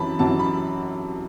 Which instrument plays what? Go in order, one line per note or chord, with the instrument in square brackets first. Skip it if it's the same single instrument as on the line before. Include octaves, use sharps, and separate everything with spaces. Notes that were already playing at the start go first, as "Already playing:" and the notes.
Already playing: [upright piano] F#2 E3 A5 B5
F#2 E3 A5
B5